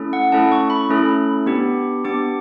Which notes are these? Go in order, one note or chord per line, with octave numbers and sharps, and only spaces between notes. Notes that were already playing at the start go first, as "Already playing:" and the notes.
Already playing: A3 C#4 E4 A4
F#5
A3 C#4 E4 A4 A5
C#6
B5
A3 C#4 E4 A4
B3 D4 G4
B3 D4 G4 D6